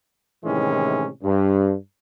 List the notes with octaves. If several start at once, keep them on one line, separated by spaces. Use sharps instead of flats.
A2 C3 D#3 E3 G#3 C#4
G2